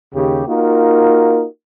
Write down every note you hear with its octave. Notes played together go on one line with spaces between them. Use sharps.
D#2 C#3 G4
A#3 D#4 F4 F#4 A#4